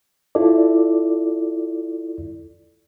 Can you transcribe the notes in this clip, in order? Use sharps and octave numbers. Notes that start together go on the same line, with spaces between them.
E4 F4 A4 D5